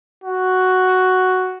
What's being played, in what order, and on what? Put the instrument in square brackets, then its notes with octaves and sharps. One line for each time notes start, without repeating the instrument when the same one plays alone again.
[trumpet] F#4